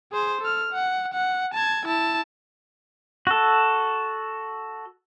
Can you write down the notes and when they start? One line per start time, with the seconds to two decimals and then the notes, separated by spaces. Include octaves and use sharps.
0.12 G#4 C5
0.41 A4 F6
0.72 F#5
1.13 F#5
1.54 A5 G#6
1.86 E4 A5
3.27 F#4 A4